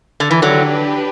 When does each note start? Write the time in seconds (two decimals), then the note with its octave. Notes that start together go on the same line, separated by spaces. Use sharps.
0.20 D3
0.31 E3
0.42 D3 F#3 D4 G4 B4